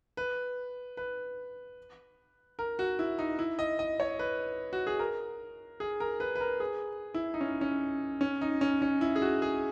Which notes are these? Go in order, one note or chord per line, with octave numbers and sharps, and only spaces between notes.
B4
B4
A#4
F#4
E4
D#4
E4
D#5
D#5
C#5
B4
F#4
G#4
A#4
G#4
A#4
B4
B4
A#4
G#4
E4
D#4
C#4
C#4
C#4
D#4
C#4
C#4
E4
G#4
F#4
G#4